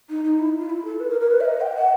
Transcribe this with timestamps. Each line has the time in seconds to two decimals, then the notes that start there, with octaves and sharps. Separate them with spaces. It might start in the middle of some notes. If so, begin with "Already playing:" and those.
0.09 D#4
0.24 D#4
0.39 E4
0.59 F4
0.69 E4
0.84 A4
1.00 B4
1.09 A#4
1.20 A#4
1.30 B4
1.40 E5
1.44 D#5
1.60 G5
1.75 F#5